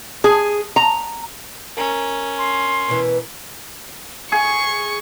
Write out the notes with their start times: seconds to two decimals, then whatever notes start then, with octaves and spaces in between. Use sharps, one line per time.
0.24 G#4
0.76 A#5
1.77 C#4 A#4 A#5
2.38 C6
2.88 B2 E3
4.32 G#4 C#6